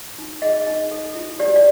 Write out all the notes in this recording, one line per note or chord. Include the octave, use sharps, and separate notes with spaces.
D#4
G#4 D#5
D#4
A4
E4
G4 D5
D5